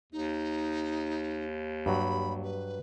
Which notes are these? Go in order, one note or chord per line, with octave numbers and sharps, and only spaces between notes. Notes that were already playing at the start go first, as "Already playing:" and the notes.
D#2 D#4
G2 F#3 B5
B4